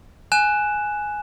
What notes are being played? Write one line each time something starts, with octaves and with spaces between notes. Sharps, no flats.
G#5 F#6 E7